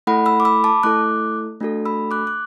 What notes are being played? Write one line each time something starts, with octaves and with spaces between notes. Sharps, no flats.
A3 E4 A4 F#5 B5
B5 E6
D6
B5 E6
A5 D6
A3 E4 A4 D6 F#6
A3 D4 F#4 A4
B5 E6
D6 F#6
F#6